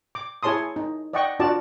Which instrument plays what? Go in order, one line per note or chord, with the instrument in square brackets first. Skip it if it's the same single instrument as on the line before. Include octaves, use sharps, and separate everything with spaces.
[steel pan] D6
E4 G#4 C#5 A5 C6 D#6
D#4
D5 D#5 F#5 G5 C#6
D4 F4 F#4 D5 A5